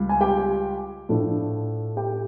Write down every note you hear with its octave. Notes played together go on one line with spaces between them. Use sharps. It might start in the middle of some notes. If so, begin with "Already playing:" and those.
Already playing: C#2 G3
G#5
G4 G5
A2 F3 A3 D4
G4 G5